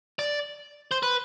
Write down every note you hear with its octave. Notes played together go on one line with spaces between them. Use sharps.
D5
C5
B4